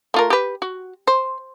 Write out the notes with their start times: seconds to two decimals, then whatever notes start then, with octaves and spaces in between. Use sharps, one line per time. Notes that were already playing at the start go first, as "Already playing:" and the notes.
0.14 A3 F4 A#4
0.30 G4 B4
0.62 F#4
1.07 C5